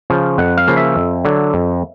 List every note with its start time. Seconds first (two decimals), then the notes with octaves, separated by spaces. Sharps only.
0.10 C#3 F3
0.38 F2 F#5
0.57 F5
0.67 C#3 F3 A#3
0.77 E5
0.96 F2
1.25 D3 F#3
1.54 F2